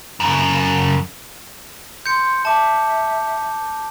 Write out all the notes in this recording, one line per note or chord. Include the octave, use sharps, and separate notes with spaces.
F#2 C#3
C6 G6 C#7
E5 A5 D6